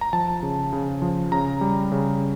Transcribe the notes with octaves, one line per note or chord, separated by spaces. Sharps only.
A#5
F3 A5
C#3
C#3
F3
C#3 A#5
G3
C#3